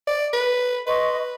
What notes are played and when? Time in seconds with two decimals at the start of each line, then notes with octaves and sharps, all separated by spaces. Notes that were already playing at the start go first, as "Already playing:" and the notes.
0.07 D5
0.33 B4
0.87 B4 D#5 C6 C#6